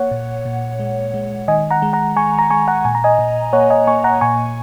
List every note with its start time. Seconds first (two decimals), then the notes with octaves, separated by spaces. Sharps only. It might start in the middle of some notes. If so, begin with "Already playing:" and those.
Already playing: A#3 C#5 F#5
0.11 A#2
0.45 A#2
0.80 G#3
1.14 G#3
1.48 D#3 D#5 G#5
1.71 F#5 A#5
1.82 G#3
1.93 F#5 A#5
2.16 G#3 G#5 C#6
2.39 A#5
2.50 G#3 G#5 C#6
2.68 F#5 A#5
2.85 A#2 G#5
2.95 A#5
3.04 D#5 G#5
3.19 A#2
3.53 A#3 C#5 F#5
3.70 D#5 G#5
3.87 A#3 G#5 C#6
4.04 F#5 A#5
4.21 A#2 G#5 C#6